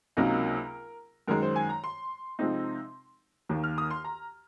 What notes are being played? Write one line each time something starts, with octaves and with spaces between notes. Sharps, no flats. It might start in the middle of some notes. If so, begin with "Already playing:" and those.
C#2 C3 F#3 A#3 D#4 A#4
F#2 D#3 G#3 A#4
C5
G#5
A#5
C6
C3 F3 G#3 C4 D#4
D#2 D#3 A#3
F6
D#6
C6
A#5